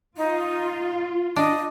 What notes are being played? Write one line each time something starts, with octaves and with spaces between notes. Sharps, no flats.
D#4 F4
D4 D#5